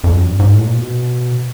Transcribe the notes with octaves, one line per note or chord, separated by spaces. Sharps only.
F2
F#2
G2
G#2
A2
A#2
B2